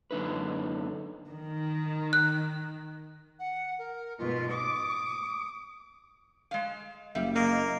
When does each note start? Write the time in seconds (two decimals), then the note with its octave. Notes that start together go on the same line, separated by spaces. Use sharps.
0.11 F#2 D3 D#4 B4
1.29 D#3
2.13 F#6
3.39 F#5
3.79 A#4
4.19 G#2 B2 F4
4.50 D6 D#6
6.51 G#3 F5
7.15 F#1 G3 E5 F5
7.35 C3 A#3 D#5 F5